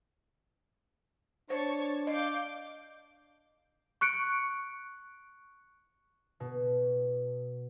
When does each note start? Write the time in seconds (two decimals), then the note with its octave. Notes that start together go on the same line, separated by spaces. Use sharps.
1.50 D4 C5 C#5 A5 C#6
2.07 D#5 F5 D6 G6
4.01 C#6 F#6 C#7 D7
6.40 B2